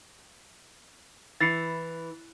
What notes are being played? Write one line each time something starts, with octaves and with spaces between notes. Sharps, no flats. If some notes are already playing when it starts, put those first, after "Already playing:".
E3 A6 C7 C#7